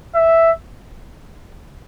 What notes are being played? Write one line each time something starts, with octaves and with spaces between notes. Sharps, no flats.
E5